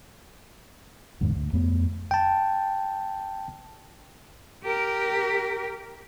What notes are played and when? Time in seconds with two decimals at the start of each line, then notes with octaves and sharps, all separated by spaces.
1.21 F#1 E2 G#2 D3
1.35 D2
1.53 F2 A3 B3
2.11 G5 A5
4.64 G4 A#4